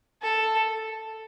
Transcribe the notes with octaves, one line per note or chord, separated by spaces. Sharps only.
A4